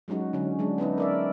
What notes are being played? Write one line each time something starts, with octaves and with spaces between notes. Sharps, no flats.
F#3 G#3 C#4 D#4 F#4
D3 F#3 C#4
F#3 G#3 D4
B3 C#4 D#4 E4
A#4 D5 E5